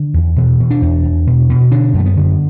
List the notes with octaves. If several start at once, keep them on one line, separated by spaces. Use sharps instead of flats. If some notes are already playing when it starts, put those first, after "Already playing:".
Already playing: D3
E2
B2 E3
B2
D4
E2
E2
B2
B2
D3 D4
F#2
A3
B3
D3